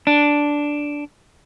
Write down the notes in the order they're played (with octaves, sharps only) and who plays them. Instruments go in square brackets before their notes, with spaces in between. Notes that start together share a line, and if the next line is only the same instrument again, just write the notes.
[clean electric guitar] D4